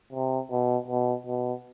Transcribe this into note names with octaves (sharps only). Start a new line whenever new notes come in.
C3
B2
B2
B2